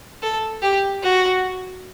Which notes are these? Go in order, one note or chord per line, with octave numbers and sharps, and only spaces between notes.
A4
G4
F#4